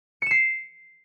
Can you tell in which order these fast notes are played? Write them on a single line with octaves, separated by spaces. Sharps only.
C#7 E7 C7